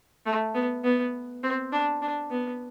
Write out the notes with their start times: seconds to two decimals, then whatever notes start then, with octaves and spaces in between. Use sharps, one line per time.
0.26 A3
0.54 B3
0.84 B3
1.43 C4
1.72 D4
2.02 D4
2.31 B3